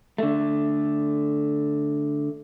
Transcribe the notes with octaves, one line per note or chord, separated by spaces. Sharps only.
D3 A3